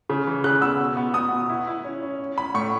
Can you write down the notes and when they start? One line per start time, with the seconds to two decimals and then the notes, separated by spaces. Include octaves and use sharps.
0.09 C#3
0.27 E3
0.44 C#3 F#6
0.62 B3 E6
0.79 B2
0.97 B3
1.14 B3 D#6
1.32 B2
1.49 E4
1.67 E4
1.84 C#4
2.03 C#4
2.19 C#4
2.37 C#4 B5
2.55 A2 C#6